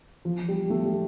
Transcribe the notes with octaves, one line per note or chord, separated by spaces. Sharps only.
F3
G3
A3
G3